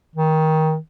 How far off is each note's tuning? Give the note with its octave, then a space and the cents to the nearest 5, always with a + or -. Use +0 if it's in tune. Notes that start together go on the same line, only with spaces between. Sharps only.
D#3 +20